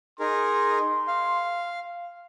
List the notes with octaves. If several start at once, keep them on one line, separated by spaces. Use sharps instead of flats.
D#4 G#4 A#4 C6
F5